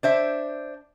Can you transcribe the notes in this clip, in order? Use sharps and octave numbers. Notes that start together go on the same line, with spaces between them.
D4 C5 E5